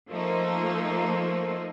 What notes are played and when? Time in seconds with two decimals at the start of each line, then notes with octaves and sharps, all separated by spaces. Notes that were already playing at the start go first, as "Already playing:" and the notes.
0.10 F3 A3 A#3 D#4